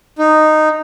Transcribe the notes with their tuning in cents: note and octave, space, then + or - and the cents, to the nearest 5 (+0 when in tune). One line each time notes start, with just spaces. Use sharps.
D#4 -10